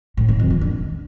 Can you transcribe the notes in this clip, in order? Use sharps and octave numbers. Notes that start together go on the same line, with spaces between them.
A2
D#3
F2
E3
D3